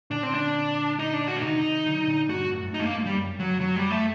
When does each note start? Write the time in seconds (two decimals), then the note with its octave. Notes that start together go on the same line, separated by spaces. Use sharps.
0.11 A#2 D3 D4
0.23 C4
0.34 D4
0.99 D#4
1.14 D4
1.28 F#4
1.37 D4
1.42 C3 D#3 D#4
1.86 D3 F#3
2.08 A#2 D3
2.29 G2 F#4
2.52 F#2 A2
2.68 A2
2.73 G2 D#4
2.80 A3
2.85 A#3
2.96 G2
3.06 G3
3.17 F#2
3.39 F#3
3.61 F#3
3.76 G3
3.91 A3